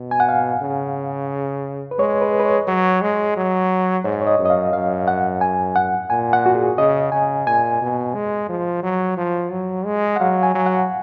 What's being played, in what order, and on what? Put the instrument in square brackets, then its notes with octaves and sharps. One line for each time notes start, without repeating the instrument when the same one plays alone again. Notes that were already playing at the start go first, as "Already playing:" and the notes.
Already playing: [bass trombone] B2
[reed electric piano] G#5
F#5
F5
[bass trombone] C#3
[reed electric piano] B4
[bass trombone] G#3 [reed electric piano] C#5
[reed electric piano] B4
B4
C#5
[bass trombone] F#3
G#3
F#3
[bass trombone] G#2 [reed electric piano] C#5
[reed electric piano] C#5
D#5
[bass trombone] F#2
[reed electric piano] D#5
F5
[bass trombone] F#2 [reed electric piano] F5
[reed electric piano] F#5
G#5
F#5
[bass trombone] A#2 [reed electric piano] G#5
[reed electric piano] F#5
F#4
G#4
[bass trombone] C#3 [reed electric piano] D#5
[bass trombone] C#3 [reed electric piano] G#5
[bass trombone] A#2 [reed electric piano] G#5
[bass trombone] B2
G#3
F3
F#3
F3
F#3
G#3
[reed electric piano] F#5
[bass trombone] F#3 [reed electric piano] F5
[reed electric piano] G#5
[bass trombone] F#3
[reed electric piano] F#5